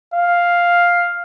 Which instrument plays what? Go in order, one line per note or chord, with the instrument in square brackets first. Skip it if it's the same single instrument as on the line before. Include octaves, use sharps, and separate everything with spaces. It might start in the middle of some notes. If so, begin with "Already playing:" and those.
[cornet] F5